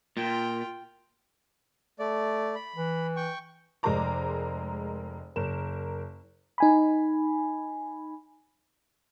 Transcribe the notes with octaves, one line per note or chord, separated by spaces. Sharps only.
A#2 F4 G5
A3 D5
B5
E3
G5 C#6
F1 G#3 A#4 C5 A#5 D6
F#1 A#4 E7
D#4 G#5 B5